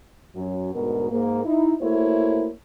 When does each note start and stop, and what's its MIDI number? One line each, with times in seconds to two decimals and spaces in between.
0.35 0.70 42
0.35 0.70 54
0.74 1.07 38
0.74 1.07 44
0.74 1.07 47
0.74 1.07 70
1.10 1.44 44
1.10 1.44 58
1.45 1.73 63
1.45 1.73 64
1.81 2.48 57
1.81 2.48 58
1.81 2.48 64
1.81 2.48 66
1.81 2.48 72
1.81 2.48 73